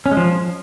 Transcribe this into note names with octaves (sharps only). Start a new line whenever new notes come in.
C#4
G#3
F3